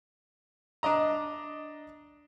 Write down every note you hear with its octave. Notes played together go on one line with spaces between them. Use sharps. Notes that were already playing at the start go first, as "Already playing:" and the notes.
D4 D5 D#5 A#5